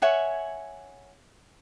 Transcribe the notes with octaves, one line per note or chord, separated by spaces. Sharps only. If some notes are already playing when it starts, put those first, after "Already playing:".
C#5 E5 F#5 G#5